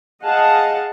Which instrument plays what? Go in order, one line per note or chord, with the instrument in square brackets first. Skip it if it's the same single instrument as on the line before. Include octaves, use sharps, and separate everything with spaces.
[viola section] G#4 D#5 F5 F#5 A5